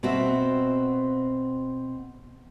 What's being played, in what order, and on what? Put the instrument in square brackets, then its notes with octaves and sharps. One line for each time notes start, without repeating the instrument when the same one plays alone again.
[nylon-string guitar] B2 C4 F#4 E5